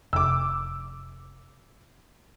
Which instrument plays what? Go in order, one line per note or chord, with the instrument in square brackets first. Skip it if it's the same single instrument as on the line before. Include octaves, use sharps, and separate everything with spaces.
[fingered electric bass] F1 [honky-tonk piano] D6 E6